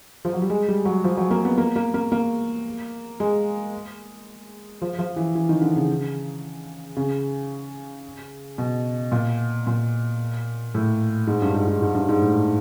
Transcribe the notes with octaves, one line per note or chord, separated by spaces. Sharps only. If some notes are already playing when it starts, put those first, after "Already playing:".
F3
F#3
G3
G#3
G3
F#3
F3
F#3
A#3
B3
A#3
A#3
A#3
A#3
G#3
F3
F3
E3
E3
D#3
D3
C#3
C#3
B2
A#2
A#2
A2
G#2
G2
G#2
G#2
G#2
G2
G#2
A2